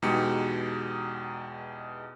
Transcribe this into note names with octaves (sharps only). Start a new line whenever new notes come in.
E2 B2 G#3 D#4 G4 C#7